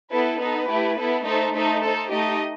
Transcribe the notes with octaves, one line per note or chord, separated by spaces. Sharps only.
B3 E4 A4 B4
B3 D#4 A4 B4
A3 E4 G4
B3 E4 A4
A3 D#4 A4 C5
A3 D#4 A4 C5
D#4 A4 C5
A3 D#4 G4 D#5